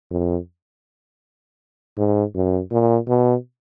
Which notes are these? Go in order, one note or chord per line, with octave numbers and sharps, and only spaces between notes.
F2
G#2
F#2
A#2
B2